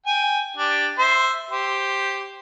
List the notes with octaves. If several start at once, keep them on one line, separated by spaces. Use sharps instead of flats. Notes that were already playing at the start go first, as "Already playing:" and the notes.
G5 G#5
D4 G4
C5 E5
G4 C5